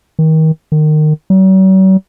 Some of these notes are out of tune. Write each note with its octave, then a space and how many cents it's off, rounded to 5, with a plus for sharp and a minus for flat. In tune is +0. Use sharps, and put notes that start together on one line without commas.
D#3 +30
D#3 -25
F#3 +45